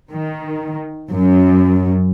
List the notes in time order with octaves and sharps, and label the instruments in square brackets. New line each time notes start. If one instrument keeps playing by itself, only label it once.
[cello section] D#3
F#2